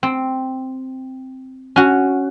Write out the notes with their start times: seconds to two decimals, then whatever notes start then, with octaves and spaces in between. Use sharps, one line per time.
0.03 C4
1.76 C#4 F#4